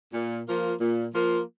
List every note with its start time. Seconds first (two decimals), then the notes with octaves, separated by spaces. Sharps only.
0.13 A#2
0.47 F3 A#3 F4 A#4
0.79 A#2
1.13 F3 A#3 F4 A#4